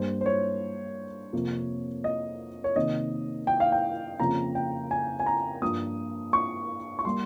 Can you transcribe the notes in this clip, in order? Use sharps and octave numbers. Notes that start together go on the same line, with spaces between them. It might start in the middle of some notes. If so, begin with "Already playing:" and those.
Already playing: G2 G3 A#3 C5
C5
C#5
F2 C3 F3 A#3
D#5
C#5
C3 D#3 A#3 D#5
G5
F5
G5
F2 C#3 F3 A#3 A#5
G5
G#5
G#5
A#5
G2 F3 A#3 D#6
C#6
C#6
G3 A#3 C6